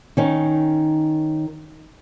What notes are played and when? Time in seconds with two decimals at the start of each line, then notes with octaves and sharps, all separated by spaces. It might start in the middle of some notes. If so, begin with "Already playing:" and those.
0.17 D#3 C#4 D#4